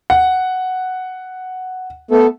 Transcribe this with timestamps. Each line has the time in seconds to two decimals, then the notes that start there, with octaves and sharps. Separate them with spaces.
0.10 F#5
2.11 A3 B3 A4